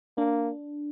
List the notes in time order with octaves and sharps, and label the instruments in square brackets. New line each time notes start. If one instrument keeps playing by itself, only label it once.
[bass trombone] A#3 [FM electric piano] D4